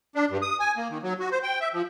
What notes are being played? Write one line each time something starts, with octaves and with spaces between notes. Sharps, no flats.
D4
G2
D#6
G#5
A#3
D#3
F#3
F#4
C5
G5
E5
F3